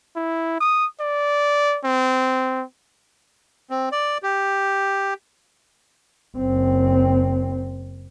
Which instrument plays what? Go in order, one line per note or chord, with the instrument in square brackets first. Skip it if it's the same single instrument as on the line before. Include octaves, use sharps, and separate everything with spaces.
[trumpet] E4
D#6
D5
C4
[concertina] C4
D5
G4
[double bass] F#1 C4